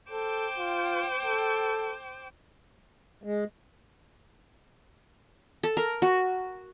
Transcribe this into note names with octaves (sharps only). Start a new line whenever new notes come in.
A4 C5 G5 D6
F4
A4
G#3
A4
A#4
F#4